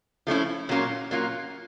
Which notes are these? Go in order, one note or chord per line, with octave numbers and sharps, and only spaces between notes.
F3 A3 C#4 E4
A#2 F#3 A#3 C#4 F4
A#2 F#3 A#3 C#4 F4